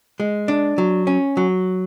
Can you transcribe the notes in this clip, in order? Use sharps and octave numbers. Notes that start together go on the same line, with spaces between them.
G#3
D4
F#3
C#4
F#3